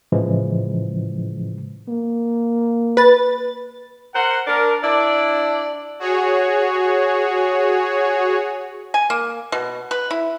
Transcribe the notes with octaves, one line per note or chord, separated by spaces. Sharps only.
A2 C#3 E3 F3 G#3
A#3
B4 A6
A#4 C5 F#5
D4 A#4
D4 E4 D5
F#4 G#4 C#5
G#5
A#3
B2
B4
E4